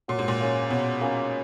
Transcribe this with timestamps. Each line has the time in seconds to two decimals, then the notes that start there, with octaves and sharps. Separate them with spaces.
0.08 A#2 F#3
0.19 G#2
0.28 A#2
0.40 A#3 C#4 G#4
0.70 B2 F#3
1.01 A#3 C#4 G#4